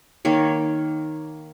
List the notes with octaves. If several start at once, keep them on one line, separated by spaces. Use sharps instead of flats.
D#3 A#3 C#5